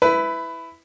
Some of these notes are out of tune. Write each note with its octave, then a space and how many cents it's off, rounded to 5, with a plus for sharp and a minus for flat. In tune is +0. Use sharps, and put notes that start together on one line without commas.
E4 +0 B4 +15